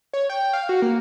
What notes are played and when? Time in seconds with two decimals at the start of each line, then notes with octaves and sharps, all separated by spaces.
0.13 C#5
0.30 G5
0.53 F5
0.69 F#4
0.82 A#3